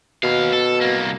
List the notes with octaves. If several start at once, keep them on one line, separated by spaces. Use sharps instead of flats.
D#2 B2 F5
A4
C2 A#3